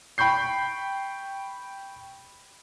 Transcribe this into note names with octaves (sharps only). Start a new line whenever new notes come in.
G5 B5 C#6 G6 C7